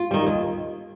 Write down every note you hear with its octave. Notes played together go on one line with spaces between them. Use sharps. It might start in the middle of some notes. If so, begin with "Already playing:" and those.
Already playing: F4
D#3 G3
D#2